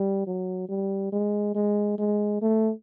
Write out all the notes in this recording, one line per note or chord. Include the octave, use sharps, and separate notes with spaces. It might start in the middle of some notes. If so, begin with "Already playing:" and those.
Already playing: G3
F#3
G3
G#3
G#3
G#3
A3